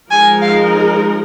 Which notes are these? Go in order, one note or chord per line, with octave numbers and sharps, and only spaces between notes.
F3 G#3 D#4 A#4 G#5
F5